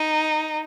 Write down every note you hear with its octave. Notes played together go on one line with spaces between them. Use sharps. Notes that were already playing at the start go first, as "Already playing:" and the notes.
Already playing: D#4